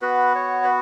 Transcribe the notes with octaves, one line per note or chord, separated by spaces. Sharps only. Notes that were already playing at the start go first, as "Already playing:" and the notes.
B3 F#4 B4
C#5
B4